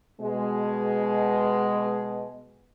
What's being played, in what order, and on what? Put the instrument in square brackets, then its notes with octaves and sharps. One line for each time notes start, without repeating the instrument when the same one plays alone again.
[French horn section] B2 G#3